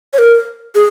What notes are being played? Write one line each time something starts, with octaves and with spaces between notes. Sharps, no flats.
C#5
A#4
G#4